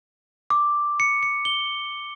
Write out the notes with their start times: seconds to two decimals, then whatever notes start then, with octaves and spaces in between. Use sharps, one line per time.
0.50 D6
1.00 C#7
1.23 C#7
1.45 G7